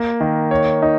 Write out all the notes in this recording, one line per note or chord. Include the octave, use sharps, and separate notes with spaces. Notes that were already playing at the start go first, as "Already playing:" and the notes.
Already playing: A#3
D#3
C#5
D#4